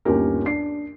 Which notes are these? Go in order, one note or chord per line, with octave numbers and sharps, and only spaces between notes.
G1 D#2 C#4 G4 A#4
D4 C7